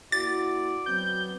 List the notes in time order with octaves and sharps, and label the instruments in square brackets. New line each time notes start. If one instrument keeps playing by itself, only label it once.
[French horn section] A#3 E4 F#4 [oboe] D5 [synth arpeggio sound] A6
[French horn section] F#3 B3 C4 [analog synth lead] G6